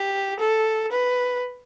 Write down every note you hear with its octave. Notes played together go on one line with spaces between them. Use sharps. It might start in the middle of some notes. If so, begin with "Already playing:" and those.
Already playing: G4
A4
B4